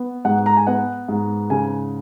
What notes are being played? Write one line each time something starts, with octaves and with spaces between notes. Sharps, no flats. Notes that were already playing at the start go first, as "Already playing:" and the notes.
Already playing: B3
G#2 F#5
A#5
G#5
B3 F#5
G#2
C#3 G#5